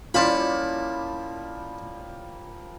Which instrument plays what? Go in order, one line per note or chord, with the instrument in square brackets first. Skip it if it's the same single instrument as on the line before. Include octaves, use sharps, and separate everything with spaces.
[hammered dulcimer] F3 G3 A#3 [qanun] C#4 E4 [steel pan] F4 [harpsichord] A5 B5